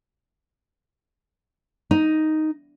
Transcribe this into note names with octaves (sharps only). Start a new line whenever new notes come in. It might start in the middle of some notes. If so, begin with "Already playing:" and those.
D#4